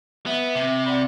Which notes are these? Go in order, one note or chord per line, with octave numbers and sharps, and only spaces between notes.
B3 E5
C3
D5 F#5 B5